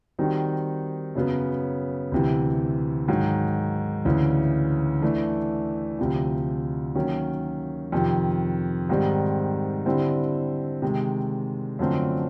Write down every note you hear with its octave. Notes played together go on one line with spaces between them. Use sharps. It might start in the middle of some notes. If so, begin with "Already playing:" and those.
D#3 G3 C4 D#4 F#4
F#2 C#3 F#3 B3
D2 C3 E3
G#2 D#3 F#3
D2 C#3 E3
E3 A3 D4
D2 C3 F3
D#3 F#3 A#3 C#4
F2 C3 D#3
G#2 D#3 G3 C4
D3 G3 C4 E4
C3 D#3 G#3
F#2 D3 F3 A3 C4